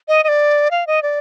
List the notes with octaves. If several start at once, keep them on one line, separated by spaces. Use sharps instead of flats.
D#5
D#5
D5
F5
D#5
D5